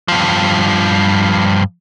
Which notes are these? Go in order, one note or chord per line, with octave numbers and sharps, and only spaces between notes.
G2 F3